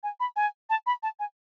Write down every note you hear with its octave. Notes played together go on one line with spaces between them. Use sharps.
G#5
B5
G#5
A5
B5
A5
G#5